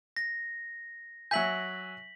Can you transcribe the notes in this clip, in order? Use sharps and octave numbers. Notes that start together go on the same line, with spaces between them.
A#6
F#3 E5 G#5 G6 B6 F#7